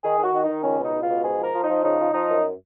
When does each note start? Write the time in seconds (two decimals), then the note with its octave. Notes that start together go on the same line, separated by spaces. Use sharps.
0.03 D#3 G#4
0.18 D#3
0.24 F#4
0.33 D#3
0.43 D#4
0.49 D#3
0.63 C#2 C#4
0.78 B2
0.83 D#4
0.93 C#2
1.03 F4
1.08 B2
1.23 G#2 G#4
1.38 F3
1.44 A#4
1.53 F3
1.64 F3 D#4
1.84 C#3 D#4
1.99 F3
2.13 F3 D#4
2.29 F#2